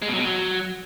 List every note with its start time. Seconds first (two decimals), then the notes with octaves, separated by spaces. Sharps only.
0.02 G#3
0.08 B2
0.13 F#3
0.19 B2
0.25 F#3